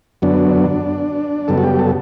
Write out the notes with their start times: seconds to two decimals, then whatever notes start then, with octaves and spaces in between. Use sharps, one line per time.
0.22 F#2 D3 F#3 B3 D4
1.48 F#2 C#3 G3 B3 A4
1.58 F#4
1.64 G4
1.79 A4